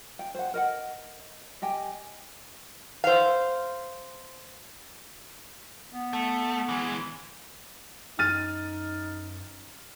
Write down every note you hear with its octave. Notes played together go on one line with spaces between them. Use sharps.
G5
C5 F#5
A#4 D#5 F#5
G4 D#5 G5 G#5
C5 F5
B3
A3
E3 G#3
F#2 D#4 F6 A6 D#7